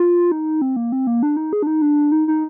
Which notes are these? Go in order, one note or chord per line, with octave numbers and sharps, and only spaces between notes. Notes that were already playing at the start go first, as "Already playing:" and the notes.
Already playing: F4
D#4
C4
A#3
C4
A#3
D4
D#4
G#4
D4
D#4
D4
D#4
D#4